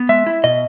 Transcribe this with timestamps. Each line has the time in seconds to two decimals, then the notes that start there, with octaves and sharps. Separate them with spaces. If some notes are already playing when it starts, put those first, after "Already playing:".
Already playing: B3
0.09 G#3 E5
0.27 E4
0.44 B2 D#5